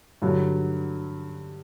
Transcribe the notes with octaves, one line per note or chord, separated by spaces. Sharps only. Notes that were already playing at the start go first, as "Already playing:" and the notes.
G2 D3 F#3